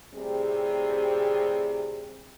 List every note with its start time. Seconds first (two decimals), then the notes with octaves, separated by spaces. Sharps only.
0.14 A2 C3 G3 C4 G#4